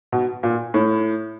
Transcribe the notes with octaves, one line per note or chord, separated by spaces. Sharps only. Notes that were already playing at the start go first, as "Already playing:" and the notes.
B2
A#2
A2